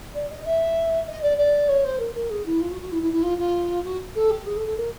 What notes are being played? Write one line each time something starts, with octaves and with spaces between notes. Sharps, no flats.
D5
D#5
E5
D#5
D5
D5
C#5
C5
A#4
A#4
G#4
E4
F4
F#4
F#4
E4
E4
E4
F4
F4
F#4
A4
G4
G#4
A4
A4
A#4